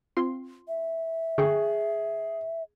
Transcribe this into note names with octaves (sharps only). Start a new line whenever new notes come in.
C4 F4 C6
E5
D3 G#4 G5 C#6